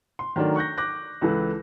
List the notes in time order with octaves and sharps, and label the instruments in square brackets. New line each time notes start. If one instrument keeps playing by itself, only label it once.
[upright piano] C6
D#3 F#3 A3 D4 A#4
C#6 F#6 G6 A#6
D6 F#6 G6 A#6
C#2 E3 A4 B4